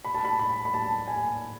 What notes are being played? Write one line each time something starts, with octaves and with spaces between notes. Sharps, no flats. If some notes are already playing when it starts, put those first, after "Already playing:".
B5
A5
B5
B5
B5
A5
G#5